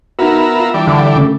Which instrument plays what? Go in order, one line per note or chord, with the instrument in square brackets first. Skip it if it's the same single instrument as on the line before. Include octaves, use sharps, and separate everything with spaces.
[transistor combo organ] B3 A#4 E5 [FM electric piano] D#4 F#4
[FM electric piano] F4
[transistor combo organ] E3 G3 D4
[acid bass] D3
[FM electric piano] C#3 A3